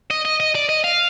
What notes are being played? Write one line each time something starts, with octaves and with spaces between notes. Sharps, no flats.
D#5
D#5
D#5
D5
D#5
F5